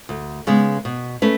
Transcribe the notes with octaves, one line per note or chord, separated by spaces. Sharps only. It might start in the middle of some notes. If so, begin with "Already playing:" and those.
D2
C#3 G#3 B3
B2
A3 C#4 B4